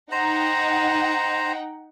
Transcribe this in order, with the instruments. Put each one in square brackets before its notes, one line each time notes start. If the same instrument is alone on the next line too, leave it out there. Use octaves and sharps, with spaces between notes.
[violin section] D#4 F#5 G5 [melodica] C5 A#5